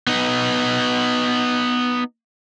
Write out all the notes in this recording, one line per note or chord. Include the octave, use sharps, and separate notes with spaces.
B3 D#4